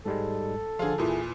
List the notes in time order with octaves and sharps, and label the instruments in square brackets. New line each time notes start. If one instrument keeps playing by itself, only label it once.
[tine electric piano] G#2 G3 G#3 [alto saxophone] A4
[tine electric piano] D3 F3 [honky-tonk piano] F4 G#4
[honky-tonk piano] E2 A#2 [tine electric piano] E4 G#4